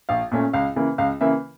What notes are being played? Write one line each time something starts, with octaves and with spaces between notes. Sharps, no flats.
A#1 F5
A#2 A3 C#4
C#2 F5
C#3 E3 A#3
C#2 F5
C#3 E3 A#3 E5